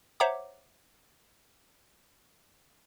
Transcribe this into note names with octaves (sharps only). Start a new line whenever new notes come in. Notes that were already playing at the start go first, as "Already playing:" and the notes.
C5 C#5 E5 F#5 A#5 D6